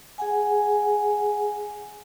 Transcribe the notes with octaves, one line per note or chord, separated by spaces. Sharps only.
G#4 F#5 G#5